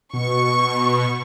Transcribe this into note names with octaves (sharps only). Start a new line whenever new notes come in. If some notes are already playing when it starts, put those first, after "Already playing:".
B2 C#6